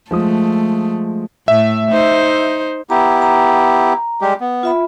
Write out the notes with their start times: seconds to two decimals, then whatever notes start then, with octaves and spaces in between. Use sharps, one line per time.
0.11 F3 G#3 A3 D#6
1.48 A2 E5
1.91 D#4 C5
2.90 B3 E4 G4 A#5
3.22 A#5
4.21 G3 G#3 G4
4.40 B3
4.63 F4 E5 B5